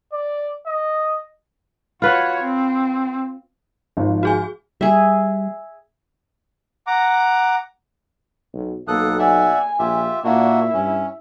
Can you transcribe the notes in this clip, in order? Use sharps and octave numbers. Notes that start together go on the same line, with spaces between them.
D5
D#5
F4 F#4 B4 C#5
C4
G#1 G#2 F3
F#4 G#4 G#5
G3 G#4 E5
F#5 A#5 D6
B1
B1 A#3 A4 D#6 F#6
D5 E5 F#5 G#5
A#1 F4 G4 E5
A#2 A#3 D4 E4 F#4
G2 C#4